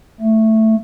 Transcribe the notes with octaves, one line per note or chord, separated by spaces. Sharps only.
A3